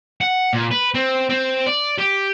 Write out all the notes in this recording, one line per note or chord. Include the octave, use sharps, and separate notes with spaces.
F#5
A#2
B4
C4
C4
D5
G4